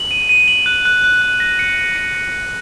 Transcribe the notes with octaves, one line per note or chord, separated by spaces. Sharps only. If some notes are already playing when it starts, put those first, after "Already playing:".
Already playing: F#7
D#7
D#7
F#7
F#6
F#6
F#6
F#6
A#6
C#7
C#7
C#7
A#6
C#7